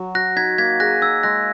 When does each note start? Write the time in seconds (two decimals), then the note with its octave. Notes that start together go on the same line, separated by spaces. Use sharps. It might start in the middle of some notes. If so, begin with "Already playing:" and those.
Already playing: F#3
0.15 F#4 F#6 A#6
0.36 D#4 G#6 B6
0.58 A#3 G#6 B6
0.80 G#4 F#6 A#6
1.01 D#4 E6 G#6
1.23 G#3 F#6 A#6